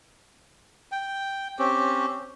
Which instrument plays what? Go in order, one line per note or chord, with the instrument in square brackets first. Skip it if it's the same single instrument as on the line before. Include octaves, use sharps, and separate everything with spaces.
[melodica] G5
C4 C#4 G4